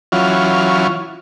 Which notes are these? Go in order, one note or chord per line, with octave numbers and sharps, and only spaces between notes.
E3 F#3 C#4 F4